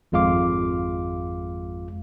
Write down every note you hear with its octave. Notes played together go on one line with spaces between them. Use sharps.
G#1 F2 G#3 F4 F5 D6